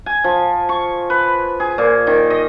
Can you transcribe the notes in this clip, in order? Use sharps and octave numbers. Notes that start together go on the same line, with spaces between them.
G#5
F3
C#6
B4
G#4
A#2
D#3
D#5